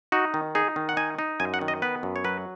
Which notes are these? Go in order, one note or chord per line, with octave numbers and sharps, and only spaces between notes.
D#4 F#4
D#3
D#4 G#4
D#3
F#5
D#4 G#5
D#4
F#2 G#5
F#5
D#3
D#5
B3 B4
F#2
C#5
F#3 B4